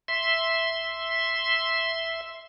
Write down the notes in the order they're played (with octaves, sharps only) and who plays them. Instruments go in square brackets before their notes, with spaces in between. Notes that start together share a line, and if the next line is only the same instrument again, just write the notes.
[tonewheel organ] E5 C6